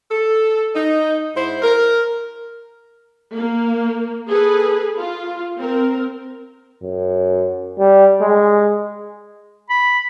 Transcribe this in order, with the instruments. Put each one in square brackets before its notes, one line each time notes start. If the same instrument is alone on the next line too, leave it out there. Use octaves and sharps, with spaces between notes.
[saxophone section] A4
D#4
G#2 E4 C5
A#4
[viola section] A#3
G#4 A4 B4
F4
C4 A#4
[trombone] F#2
G3
G#3
[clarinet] B5